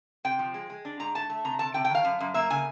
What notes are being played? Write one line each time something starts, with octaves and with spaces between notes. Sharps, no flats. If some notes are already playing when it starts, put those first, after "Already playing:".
C3 G5
F3
G#3
G#3
D4
G#2 A#5
A3 A5
A3
C3 A#5
C3 A5
C3 G5
G5
D#3
F5
F#2
F#2
A#3 E5
C#3 G#5